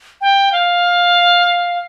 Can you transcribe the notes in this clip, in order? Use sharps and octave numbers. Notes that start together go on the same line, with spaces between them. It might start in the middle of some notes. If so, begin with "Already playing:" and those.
G5
F5